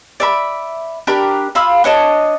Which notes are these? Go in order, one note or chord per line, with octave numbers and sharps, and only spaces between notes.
D5 E5 B5
D4 G4 A#4 B5
F4 F5 B5 E6
D4 C#5 D#5 A5